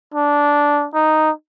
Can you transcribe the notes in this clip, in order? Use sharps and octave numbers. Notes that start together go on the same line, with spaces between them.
D4
D#4